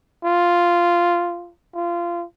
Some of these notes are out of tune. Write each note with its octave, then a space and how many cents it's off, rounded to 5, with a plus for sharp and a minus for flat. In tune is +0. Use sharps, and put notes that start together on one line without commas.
F4 -5
F4 -20